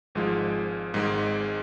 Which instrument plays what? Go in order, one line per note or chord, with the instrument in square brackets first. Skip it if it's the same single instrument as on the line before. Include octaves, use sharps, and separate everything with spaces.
[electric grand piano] G#1 G#2 F3 G#3 F4
G#1 G#2 D#3 G#3